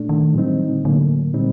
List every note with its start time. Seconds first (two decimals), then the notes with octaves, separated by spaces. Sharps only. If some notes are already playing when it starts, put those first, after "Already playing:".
Already playing: A#2 A3 D4
0.09 D#3
0.34 A2 F#3 G3 C4 D#4
0.51 D#3
0.68 D3
0.84 A2 D3 F#3 A#3
1.34 A#2 G3 C4 D#4